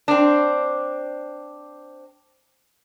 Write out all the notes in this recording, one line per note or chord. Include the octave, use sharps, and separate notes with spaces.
C4 D4